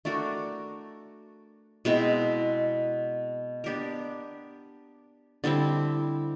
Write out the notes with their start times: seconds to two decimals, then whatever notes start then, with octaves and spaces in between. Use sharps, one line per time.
0.05 A3 D4 F#4 A#4
1.85 B2 G#3 C4 E4
3.64 B3 D4 G4 A#4
5.44 D3 G3 C4 E4